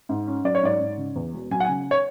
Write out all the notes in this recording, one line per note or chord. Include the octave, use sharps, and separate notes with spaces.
G#2
C#4
F#3 D5
C#5
G#2 D5
G#2
C#3
E2
E1
F#3 G#5
F#5
G#5
C#3
C#5